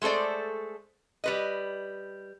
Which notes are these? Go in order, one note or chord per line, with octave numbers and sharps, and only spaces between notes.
G#3 A3 A4 C5 D5
G3 B4 D#5